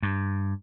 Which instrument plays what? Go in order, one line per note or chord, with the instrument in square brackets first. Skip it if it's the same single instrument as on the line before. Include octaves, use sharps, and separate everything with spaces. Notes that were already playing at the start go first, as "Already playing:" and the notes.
[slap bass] G2